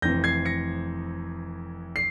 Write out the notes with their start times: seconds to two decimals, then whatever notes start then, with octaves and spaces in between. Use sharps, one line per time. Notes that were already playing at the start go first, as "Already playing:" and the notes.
0.02 F1 F2 E3 G6 A#6
0.24 G#6 C7
0.45 A#6 C#7
1.96 C7